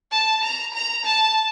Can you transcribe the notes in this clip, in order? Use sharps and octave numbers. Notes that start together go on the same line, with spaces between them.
A5
A#5
A#5
A5